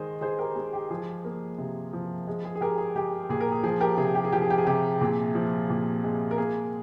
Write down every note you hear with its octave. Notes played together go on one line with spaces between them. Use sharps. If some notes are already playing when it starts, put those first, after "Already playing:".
Already playing: D#3 G#3 C5 D#5
G#3 G#4 C5
G4 A#4
G#3
G4
F3 G#4
A#3
C3
F3
G#3
G#4
G#4
G#3 G4 A#4
G#4
G#3 G4
A#2 G#4
A#4
G#4
F3 G#4
G4 A#4
C3 G#4
G4
G#4
F3 G4
G#4
G4
G#4
C3 G4
A#2 G#4
F3
A#2
G#3
A#4
A#3 G#4